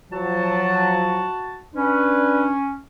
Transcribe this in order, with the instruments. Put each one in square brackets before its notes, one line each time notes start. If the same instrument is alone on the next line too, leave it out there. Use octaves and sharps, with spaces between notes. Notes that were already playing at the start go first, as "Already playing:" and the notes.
[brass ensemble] F3 F#3 [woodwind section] F#4 A5
[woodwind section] C#4 [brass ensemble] D4 B4